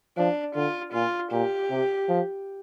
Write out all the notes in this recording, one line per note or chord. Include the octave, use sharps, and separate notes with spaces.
F3 D4
D3 F4
A#2 F4
A#2 G4
C3
F3